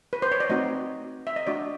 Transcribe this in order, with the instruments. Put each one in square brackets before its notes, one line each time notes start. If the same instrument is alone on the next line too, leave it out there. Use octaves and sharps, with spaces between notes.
[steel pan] B4
C5
C#5
D5
A3 C4 D#4 F#4 D#5
E5
D#5
A3 D4 F#4 D5